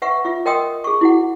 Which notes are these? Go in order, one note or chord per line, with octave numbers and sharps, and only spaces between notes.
B4 E5 F#5 C#6
F4 E5
A#4 D#5 G5 C6 D#6 E6
G#4 C#6
E4 F#4 F#5